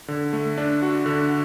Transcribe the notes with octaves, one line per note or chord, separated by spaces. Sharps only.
D3
A3
D4
F#4
D3